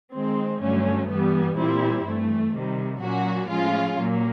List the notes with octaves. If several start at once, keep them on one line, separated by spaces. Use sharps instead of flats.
D#3 G#3 C4
G2 D3 F#3 A3 C#4
G2 E3 G3 B3
A#2 G3 C4 E4
G2 E3 A3
C3 D#3 G3
A#2 F#3 A#3 C#4 F#4
A2 F3 G#3 C#4 F4
A#2 F#3 A#3